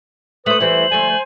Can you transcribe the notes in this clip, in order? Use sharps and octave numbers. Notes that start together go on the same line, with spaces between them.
A3 B4 C5 D#6 F#7
E3 G3 A3 E4 C5
D3 F3 A3 G#5